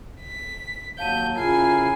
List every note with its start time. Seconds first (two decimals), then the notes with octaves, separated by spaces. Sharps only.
0.21 B6
0.98 D#2 F#3 F5 A5 G6 D#7
1.36 C#3 E4 F4 A#4 G#5 A#5 C7